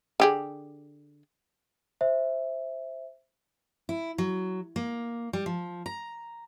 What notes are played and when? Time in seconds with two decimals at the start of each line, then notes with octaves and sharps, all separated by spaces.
0.20 D3 G4 G#4
2.01 C5 E5
3.89 E4
4.18 F#3
4.76 A#3
5.33 G3
5.46 F3
5.86 A#5